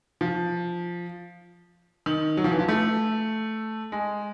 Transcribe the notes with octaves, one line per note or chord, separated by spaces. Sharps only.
F3
D#3
F#3
F3
E3
F3
A3
G#3